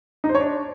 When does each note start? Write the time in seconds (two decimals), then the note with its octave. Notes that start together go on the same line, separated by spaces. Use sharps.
0.24 D#4
0.29 C5
0.35 C#5
0.40 D4